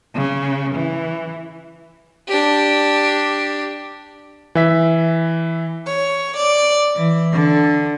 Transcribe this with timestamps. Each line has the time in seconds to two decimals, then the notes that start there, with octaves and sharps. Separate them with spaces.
0.14 C#3
0.75 E3
2.28 D4 G4
4.55 E3 E5 B6
5.87 C#5
6.36 D5
6.95 E3
7.33 D3